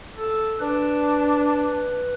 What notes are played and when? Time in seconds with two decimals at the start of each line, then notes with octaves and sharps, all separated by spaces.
0.15 A4
0.59 D4 B4